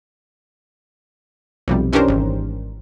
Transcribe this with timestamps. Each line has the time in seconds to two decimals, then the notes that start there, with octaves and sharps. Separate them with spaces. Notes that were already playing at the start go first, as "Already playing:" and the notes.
1.68 B1 F2 C3 G3
1.93 E3 C#4 D4 G4 A#4 C5
2.08 G#1